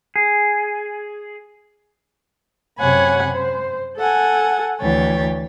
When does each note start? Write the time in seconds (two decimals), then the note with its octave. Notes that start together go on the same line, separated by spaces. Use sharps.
0.16 G#4
2.79 F#2 C3 C#5 F#5 G#5 B5
3.33 C5
3.97 A4 F#5 G#5
4.81 D2 E3 C#5 G5 A6